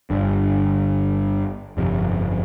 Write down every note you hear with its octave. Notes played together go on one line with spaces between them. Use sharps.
G1 G2 D3
G1 F2 C3